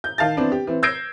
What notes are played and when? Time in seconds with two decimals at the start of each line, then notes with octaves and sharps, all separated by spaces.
0.04 G6
0.18 D#3 F5 A5 A6
0.37 E3 B3 C4 D4
0.52 G4
0.67 E3 C4
0.83 E6 G6 G#6 A#6 C7 D7